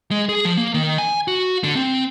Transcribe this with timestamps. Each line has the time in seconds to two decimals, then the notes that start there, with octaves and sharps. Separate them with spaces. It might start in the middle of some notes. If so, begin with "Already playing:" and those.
0.11 G#3
0.29 G#4
0.45 F3
0.57 A#3
0.74 D#3
0.98 G#5
1.28 F#4
1.64 D3
1.76 C4